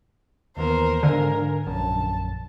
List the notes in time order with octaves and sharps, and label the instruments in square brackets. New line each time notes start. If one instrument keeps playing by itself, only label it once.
[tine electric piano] D#2 E3 B3 [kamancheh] A#4 C5
[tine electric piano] G#2 F5 G#5 [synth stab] D3 [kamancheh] A#4
[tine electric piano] A#1 F#2 [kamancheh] A5